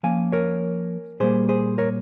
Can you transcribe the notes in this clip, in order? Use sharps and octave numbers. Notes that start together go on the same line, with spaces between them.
F3 A#3 C#4 F5 G#5
A#4 C#5
A#2 G3 A#3 G#4 C5
G#4 C5
A#4 C#5